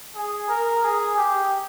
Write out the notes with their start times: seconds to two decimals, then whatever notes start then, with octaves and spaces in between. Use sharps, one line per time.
0.15 G#4
0.48 A#4
0.83 G#4
1.17 G4